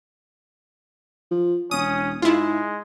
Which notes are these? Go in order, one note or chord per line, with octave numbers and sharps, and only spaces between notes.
F3
E1 C#4 D#6
G#2 G#3 E4 F4